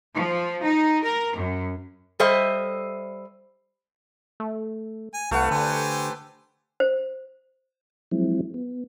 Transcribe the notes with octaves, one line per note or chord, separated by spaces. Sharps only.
F3
D#4
A#4
F#2
G3 A4 C5 D#5 E5
A3
G#5
C2 A3 B4 F5 F#5
D3 G4 C5 G#5
C5
F3 F#3 G#3 C4 E4
B3